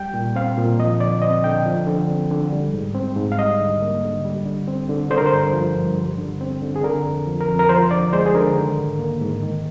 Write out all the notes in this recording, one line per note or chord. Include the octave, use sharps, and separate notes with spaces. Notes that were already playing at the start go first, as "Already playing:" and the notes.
Already playing: G3 G5
A#2
C4 F5
A#2
F3 D#5
D3 D5
C4 D#5
D3 G5
F3
D3
C4
D3
G3
G#2
C4
G#2
F5
G3 D#5
D3
A#3
D3
G3
D3
C4
D3
D3 C5
A#4
C5
G2
F3
G2
G3
D3
C4
D3
G#4
D3 A#4
F2
F3
A#4
F2
A#4
F3 C5
D3 D5
G#3 C5
G#4
D3 A#4
D#3
G#2
A#3
G#2
D#3